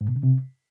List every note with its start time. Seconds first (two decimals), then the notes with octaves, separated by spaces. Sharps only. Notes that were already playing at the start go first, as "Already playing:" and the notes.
0.01 G#2
0.08 B2
0.16 C#3
0.23 C3